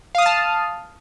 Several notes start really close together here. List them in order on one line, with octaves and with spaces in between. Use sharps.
F5 D#6 F6 A5